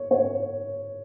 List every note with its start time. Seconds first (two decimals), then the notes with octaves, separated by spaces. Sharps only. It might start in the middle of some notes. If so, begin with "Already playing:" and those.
Already playing: C#5
0.11 C#5